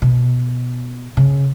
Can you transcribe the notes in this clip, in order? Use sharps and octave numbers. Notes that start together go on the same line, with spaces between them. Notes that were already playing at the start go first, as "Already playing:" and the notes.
B2
C#3